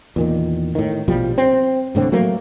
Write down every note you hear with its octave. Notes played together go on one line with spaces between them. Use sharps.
E2 A#2 D#3
A2 D#3
A#1 B2 F3 G3
C4
E1 A2 D3 C4
F#3 A3 A#3